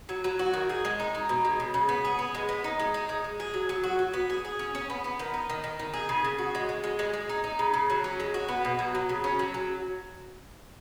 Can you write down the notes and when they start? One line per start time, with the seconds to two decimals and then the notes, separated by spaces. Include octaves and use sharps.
0.09 F#3
0.24 F#3
0.39 F#4
0.54 D#3
0.69 G#4
0.85 G#3
1.00 D#4
1.15 D#4
1.29 B2
1.45 G#3
1.60 C#3
1.74 C#3
1.89 B3
2.05 G#4
2.19 B3
2.35 G#3
2.49 B3
2.64 D#4
2.79 G#3
2.94 D#4
3.09 G#3
3.24 G#3
3.40 G#4
3.54 F#3
3.69 F#3
3.83 F#4
3.99 F#4
4.13 B3
4.30 G#4
4.45 G#4
4.59 C#4
4.75 C#4
4.90 B3
5.04 B3
5.19 D#3
5.34 D#4
5.50 D#3
5.64 D#3
5.79 D#3
5.94 G#4
6.09 C#3
6.25 C#3
6.38 F#4
6.55 G#3
6.69 G#3
6.84 G#3
6.99 G#3
7.13 G#3
7.29 D#4
7.44 D#4
7.59 C#3
7.74 C#3
7.90 F#3
8.04 C#4
8.20 G#3
8.34 F#4
8.48 B3
8.65 B2
8.79 F#3
8.95 F#3
9.09 C#3
9.24 C#4
9.39 F#3
9.54 F#3